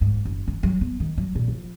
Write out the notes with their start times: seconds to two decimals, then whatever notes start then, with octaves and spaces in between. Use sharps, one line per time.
0.01 G#2
0.25 F#1
0.48 D#4
0.63 F#3
0.81 B3
1.00 D#3
1.18 F#3
1.35 A#2
1.48 F3